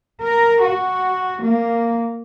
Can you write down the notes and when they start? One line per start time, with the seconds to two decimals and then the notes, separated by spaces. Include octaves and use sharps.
0.21 A#4
0.62 F#4
1.41 A#3